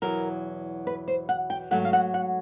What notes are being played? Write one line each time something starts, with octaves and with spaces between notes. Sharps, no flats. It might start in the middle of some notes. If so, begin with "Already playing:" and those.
E2 B2 F#3 A#4
B4
C5
F#5
G5
G#2 D#3 F#3 A3 F#5
F5
F#5
F#5